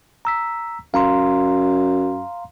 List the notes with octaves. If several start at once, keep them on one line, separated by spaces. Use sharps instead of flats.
A#5 E6 B6
F#2 F5 A#5 C6